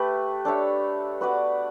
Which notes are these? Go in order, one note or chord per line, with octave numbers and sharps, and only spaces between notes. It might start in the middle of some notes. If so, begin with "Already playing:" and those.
Already playing: A3 G4 B4
D4 A4 C#5 E5
B3 F#4 B4 D5